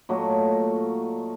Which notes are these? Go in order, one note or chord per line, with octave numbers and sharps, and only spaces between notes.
A#2 F#3 A3 D#5